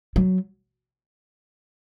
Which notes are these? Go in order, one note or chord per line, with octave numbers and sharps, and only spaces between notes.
F#3